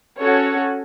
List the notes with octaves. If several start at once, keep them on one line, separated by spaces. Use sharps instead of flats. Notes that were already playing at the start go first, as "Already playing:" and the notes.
C#4 F#4 A4 C#5